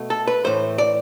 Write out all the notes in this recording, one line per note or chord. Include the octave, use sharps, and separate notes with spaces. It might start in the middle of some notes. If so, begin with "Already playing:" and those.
Already playing: B2 A3
A4
B4
A2 E3 A3 C5
D5